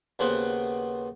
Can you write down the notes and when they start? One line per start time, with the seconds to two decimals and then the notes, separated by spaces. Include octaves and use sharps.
0.19 D#2 C#3 B3 F#4 B4 C5